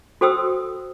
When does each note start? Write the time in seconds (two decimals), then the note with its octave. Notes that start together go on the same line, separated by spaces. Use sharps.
0.21 F#4 A4 C5 G5 D#6 E6